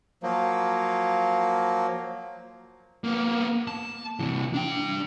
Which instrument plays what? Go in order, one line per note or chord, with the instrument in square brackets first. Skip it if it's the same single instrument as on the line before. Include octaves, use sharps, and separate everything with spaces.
[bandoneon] F3 F#3 A#3
[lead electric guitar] A#3 B3
A5
C3 E3
D4 G5